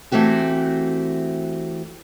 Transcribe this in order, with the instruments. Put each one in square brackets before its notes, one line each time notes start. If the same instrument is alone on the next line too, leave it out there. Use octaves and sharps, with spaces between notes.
[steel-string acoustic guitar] E3 A3 C4 F#4 G4